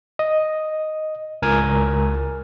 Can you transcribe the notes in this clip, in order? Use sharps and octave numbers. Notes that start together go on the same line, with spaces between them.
D#5
C#2 A#4 G#5